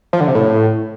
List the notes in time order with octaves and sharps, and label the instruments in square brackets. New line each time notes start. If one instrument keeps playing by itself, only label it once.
[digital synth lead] F3
D3
C3
A2